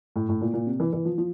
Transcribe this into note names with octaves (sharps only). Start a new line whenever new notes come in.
A2
A2
A#2
A#2
C3
E3
E3
F3
F3